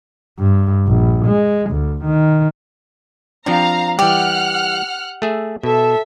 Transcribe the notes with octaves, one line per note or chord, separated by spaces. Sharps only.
G2
A#1
G#3
D2
D#3
F3 G3 C4 D4 F5 A#5
E3 G3 G4 F#5 F6 F#6
A3 G#4 E5
B2 A4 E5